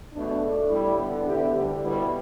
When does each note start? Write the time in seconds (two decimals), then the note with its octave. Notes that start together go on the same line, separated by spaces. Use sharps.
0.13 E2 B2 A3 D4
0.43 A2 A3 D4 A4
0.70 A2 G3 E4
0.98 D3 B3 D4
1.26 D2 D3 B3 E4 G4
1.54 D2 D3 G3
1.82 B2 G3 B3 E4